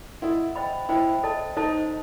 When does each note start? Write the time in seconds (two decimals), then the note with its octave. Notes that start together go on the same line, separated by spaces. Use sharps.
0.22 E4 A4 D#5 F#5 C6
0.56 C5 D#5 G5 B5
0.89 E4 C5 D#5 G5 B5
1.23 A4 C5 D#5 A5
1.57 D#4 A4 C5 D#5 A5